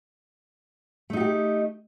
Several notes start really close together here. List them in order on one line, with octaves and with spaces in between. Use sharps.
A3 D#4 F#4 G4